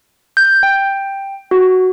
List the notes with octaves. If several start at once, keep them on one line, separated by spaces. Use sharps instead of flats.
G6
G5
F#4